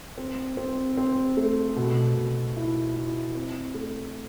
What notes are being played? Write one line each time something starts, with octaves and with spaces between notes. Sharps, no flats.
C4
C4
C4
A3
B2
B2
E4
E4
C4
A3